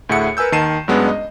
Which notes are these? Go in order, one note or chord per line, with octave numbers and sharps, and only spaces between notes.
D2 A2 G#4 E5 F#5 C#7
A#4 B4 G#5 E6 G6
D#2 D#3 A5 C7 D#7 E7
G2 F#3 G#3 B3 C#4 D4
D#5